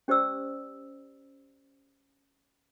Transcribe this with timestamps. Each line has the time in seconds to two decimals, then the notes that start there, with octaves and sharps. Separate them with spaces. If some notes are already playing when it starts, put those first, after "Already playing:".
0.08 C#4 G4 C5 D5 E6